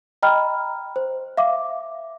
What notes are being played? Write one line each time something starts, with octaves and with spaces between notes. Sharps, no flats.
D#5 G5 A#5 B5 F6
C5
E5 F5 D6